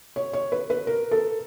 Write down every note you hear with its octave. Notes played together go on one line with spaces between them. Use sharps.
C#5
C#5
B4
B4
A#4
A4